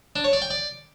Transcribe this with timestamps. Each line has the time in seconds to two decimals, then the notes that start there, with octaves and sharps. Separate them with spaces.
0.16 D4
0.24 C#5
0.33 D5
0.42 G5
0.50 D5